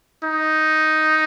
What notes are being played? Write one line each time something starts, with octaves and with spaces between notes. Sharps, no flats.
D#4